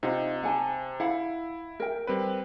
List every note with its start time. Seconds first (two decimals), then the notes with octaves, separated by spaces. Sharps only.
0.03 C3 D#4 F4 F#5
0.43 F#5 G#5 A5
1.00 E4 F5 F#5 B5
1.80 A#4 G5
2.07 G3 C4 B4